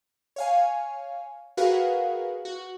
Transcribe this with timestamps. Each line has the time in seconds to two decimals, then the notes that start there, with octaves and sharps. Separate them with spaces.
0.36 C#5 F5 G#5
1.57 F#4 G#4 A#4 B4 F5 F#5
2.45 F#4